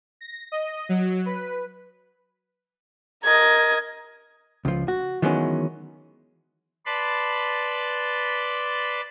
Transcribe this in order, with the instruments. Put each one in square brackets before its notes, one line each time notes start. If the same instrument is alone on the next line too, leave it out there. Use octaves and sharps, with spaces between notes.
[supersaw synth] A#6
D#5
F#3
B4
[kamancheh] A#4 D#5 [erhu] G#6
[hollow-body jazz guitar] C#2 F3
F#4
D#3 E3 F#3 G#3 B3 C#4
[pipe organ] B4 D5 A5 B5 C6